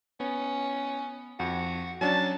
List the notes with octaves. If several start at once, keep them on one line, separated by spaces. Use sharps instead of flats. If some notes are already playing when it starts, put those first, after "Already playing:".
B3 C#4
F2 F#4
F#3 C#4 D4 A5